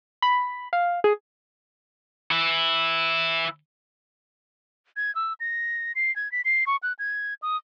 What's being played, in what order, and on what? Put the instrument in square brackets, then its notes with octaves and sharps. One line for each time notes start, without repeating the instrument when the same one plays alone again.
[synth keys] B5
F5
G#4
[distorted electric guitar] E3 E4
[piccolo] G#6
E6
A#6
C7
G#6
B6
C7
C#6
F#6
G#6
D#6